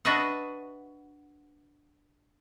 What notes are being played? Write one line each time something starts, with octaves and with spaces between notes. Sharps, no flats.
D4 F#4 B4 D#5 E5 F#5